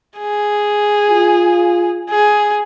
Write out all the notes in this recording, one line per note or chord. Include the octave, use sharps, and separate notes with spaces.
G#4
F4
G#4